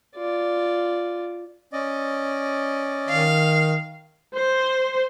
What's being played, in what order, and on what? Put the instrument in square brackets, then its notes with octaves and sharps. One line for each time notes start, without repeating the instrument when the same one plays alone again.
[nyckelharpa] F4 D5
[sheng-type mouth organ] C#4 D5 D#5
[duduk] D#3 [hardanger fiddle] F5
[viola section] C5